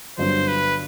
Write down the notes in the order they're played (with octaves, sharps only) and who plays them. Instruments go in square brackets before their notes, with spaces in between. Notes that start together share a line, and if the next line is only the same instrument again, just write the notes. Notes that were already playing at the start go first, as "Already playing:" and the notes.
[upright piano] G1 G2 F#3 [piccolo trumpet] C5
[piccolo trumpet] B4